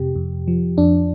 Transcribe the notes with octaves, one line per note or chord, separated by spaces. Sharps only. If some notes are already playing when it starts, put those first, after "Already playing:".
Already playing: F2 C3 G4
F2
F3
F2 D4